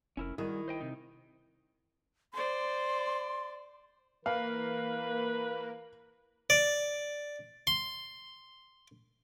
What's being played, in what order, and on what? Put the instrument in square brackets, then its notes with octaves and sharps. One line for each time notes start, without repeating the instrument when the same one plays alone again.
[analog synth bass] F1 [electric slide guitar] C#4 E4 A#4
[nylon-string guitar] D#3 [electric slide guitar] G3 F#4 G#4 [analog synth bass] E4
[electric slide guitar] C5 D#5 G5
C3 D#4
[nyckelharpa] C5 D5 [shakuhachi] C6
[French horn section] E3 A#4 [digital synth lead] A#3 [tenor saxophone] B4 [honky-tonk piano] F5
[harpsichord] D5
C6